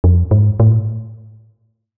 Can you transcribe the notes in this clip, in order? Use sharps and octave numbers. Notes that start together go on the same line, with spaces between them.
F2
G#2
A2